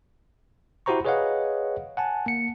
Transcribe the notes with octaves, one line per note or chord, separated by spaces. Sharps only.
E4 F#4 G4 C5 A#5 C#6
G#4 B4 C#5 D#5 F5 F#5
F#5 G#5 A5
A#3 C#7